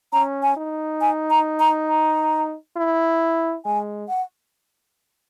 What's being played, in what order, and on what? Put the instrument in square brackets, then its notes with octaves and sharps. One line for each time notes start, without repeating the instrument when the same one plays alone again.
[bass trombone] C#4 [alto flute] A#5
[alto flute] G#5
[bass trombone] D#4
[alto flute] G#5
A#5
A#5
A#5
[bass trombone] E4
[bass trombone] G#3 [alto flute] G#5
[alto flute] F#5